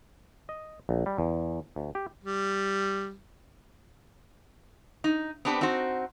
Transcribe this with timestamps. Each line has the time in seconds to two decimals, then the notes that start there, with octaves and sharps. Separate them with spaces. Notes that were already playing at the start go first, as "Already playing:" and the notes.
0.49 D#5
0.89 A#1
1.06 G3
1.18 E2
1.76 D2
1.95 G4
2.24 G3
5.04 D#4
5.45 B3 C4 D4 G4 B4
5.61 C4 D#4 F#4 C5